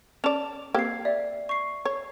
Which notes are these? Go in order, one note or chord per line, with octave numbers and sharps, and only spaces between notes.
C#4 D5 A5 F7
A#3 C4 G4 G#6 C7
D5 E5
C#6 C7
C#5